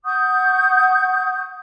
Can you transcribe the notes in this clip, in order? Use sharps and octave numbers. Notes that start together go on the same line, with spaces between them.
F#5 C#6 D#6 G6